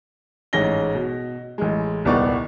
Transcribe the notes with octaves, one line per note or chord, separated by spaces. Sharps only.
A1 G#2 C#4 A#6 G7
B2
A1 G#3
D#1 C2 D#3 B3 D5 C#6